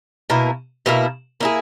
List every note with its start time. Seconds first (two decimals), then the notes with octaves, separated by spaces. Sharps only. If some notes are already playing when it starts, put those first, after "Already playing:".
0.30 B2 A#3 E4 A#4
0.86 B2 A#3 E4 A#4
1.40 A#3 E4 G#4